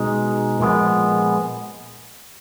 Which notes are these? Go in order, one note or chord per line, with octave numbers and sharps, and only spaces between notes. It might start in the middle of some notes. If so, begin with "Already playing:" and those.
Already playing: B2 G#3 D#4
A#2 F3 G#3 B3